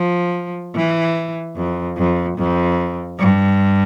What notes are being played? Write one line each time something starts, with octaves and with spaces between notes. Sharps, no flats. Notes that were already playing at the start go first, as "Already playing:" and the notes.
Already playing: F3
E3
F2
F2
F2
G2